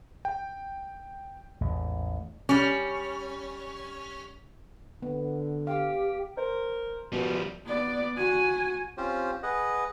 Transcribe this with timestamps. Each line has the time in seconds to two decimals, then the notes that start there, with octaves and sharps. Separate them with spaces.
0.25 G5
1.61 A1 E2 G#2
2.49 G3 C#4
5.02 D3 B3
5.67 G4 F5 G5
6.37 A#4 C5
7.12 F#2 B2 F3 G3
7.66 B3 D5
8.17 F#4 G#5
8.97 C4 C#4 F4 G4 C5
9.43 G#4 B4 D#5 F#5